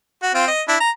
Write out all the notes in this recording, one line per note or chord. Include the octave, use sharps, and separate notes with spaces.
F#4
C4 F4
D#5
D4 E4
A#5